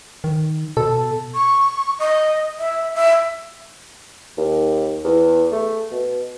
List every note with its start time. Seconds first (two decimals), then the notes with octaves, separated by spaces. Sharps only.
0.24 D#3
0.77 B2 A4
1.34 C#6
1.99 D#5
2.58 E5
2.95 E5
4.38 D#2
5.04 E2
5.52 A3
5.91 B2